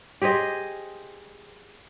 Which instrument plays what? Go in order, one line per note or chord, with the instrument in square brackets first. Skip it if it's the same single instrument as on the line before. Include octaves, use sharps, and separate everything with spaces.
[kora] G4 G#4 C5 D#5